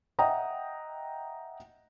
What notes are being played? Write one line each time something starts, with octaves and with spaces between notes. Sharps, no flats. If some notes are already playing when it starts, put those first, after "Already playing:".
D#5 E5 F#5 G5 A#5 D#6